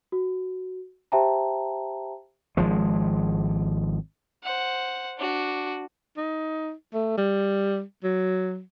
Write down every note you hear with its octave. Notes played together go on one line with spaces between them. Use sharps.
F#4
G4 C5 E5 G5 A5 A#5
G#1 F3 G#3
C5 F#5
D4 F#4
D#4
A3
G3
F#3